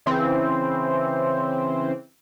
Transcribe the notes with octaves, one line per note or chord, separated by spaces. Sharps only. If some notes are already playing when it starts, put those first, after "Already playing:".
C#3 E3 C4